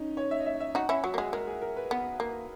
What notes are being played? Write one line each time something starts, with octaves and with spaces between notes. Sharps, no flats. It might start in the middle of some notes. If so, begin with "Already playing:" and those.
Already playing: C#4 D#4
C#5
E5
D#5
E5
E5
D#4 F#4 F#5
C#4 E4 E5
F#3 F#4
A#3
G#3 G#4
G#3 A#4
G#4
A#4
B4
B3
A#3